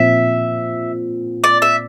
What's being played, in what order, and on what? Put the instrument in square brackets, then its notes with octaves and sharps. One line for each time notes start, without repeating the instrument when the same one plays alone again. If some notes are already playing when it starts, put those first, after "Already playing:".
Already playing: [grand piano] A#2 F3 C4 [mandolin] E5
[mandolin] D5
E5